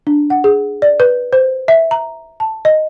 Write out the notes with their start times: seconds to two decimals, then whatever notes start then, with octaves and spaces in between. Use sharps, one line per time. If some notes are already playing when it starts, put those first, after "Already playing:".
0.07 D4
0.30 F#5
0.44 G#4
0.82 D5
1.00 B4
1.33 C5
1.68 E5
1.91 A#5
2.40 A5
2.65 D#5